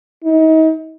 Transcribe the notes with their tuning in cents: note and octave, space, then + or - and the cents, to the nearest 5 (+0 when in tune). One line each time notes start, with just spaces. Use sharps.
D#4 +35